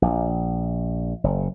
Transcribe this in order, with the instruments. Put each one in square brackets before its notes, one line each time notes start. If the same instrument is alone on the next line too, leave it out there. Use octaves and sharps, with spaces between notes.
[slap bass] A#1
F#1